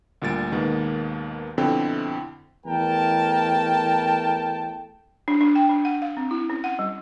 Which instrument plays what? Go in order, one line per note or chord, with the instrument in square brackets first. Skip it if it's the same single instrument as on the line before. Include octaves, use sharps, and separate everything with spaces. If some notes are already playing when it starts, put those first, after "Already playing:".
[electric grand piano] D2 A#2 G3 A6 D7
D#2 B2 D#3 G#3 A#3 B3
F2 B2 D3 C4 E4 G5
[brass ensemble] E2 A3 A#4 G5 A5
[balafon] D4
D4
G5
D4
F#5
F5
C4
E4
C#4
F#5
G3